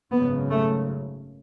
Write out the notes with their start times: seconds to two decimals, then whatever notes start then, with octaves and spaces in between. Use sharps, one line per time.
0.11 G#1 F#2 C#3 B3
0.50 A3